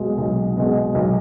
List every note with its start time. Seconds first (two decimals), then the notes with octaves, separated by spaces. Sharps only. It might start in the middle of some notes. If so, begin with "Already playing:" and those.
Already playing: B1 B2 G#3
0.18 B1
0.57 B2 G#3
0.95 B1